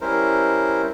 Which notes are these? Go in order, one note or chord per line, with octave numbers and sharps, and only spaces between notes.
G3 C#4 E4 A#4 C5